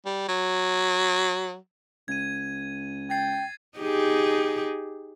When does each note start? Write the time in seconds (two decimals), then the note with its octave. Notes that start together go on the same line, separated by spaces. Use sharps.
0.06 G3
0.28 F#3
2.08 C#2 G#6 D#7
3.10 G5 G#6 A6 C7
3.78 D#4 G4 G#4